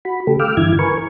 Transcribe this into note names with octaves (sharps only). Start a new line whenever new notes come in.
F#4 B5
C#3 A3 G4 A4
F5 G5 D6 E6 F6
G2 D3 E3 E4 G#6
A#4 B4 G#5 C#6